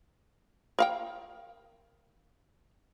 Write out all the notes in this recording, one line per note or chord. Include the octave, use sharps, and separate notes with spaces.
A#4 F5 G5